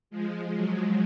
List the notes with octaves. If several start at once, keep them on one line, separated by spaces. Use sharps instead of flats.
F3 G#3
F#3